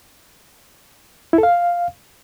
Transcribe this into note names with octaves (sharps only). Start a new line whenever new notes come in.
E4
A4
F5